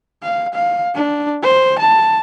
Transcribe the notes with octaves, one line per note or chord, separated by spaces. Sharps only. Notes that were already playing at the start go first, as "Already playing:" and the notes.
F5
F5
D4
C5
A5